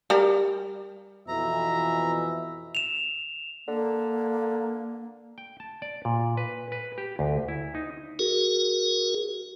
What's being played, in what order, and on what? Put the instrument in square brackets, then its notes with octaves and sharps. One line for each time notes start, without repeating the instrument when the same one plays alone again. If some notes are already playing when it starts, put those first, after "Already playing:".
[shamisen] G3 A#4
[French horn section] F2 B2 E3 [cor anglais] E5 [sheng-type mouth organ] A#5
[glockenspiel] E7 F7
[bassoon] D3 [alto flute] A#3
[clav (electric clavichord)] G5
A5
D5
A#2
B4
B4
G4
D2
E4
D#4
[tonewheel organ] F#4 G#4 A#4